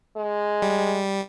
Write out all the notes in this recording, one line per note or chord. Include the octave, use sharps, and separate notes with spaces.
G#3
G3